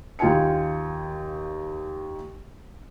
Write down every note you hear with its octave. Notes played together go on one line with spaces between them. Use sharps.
D#2 F4 G5 G#5 C#7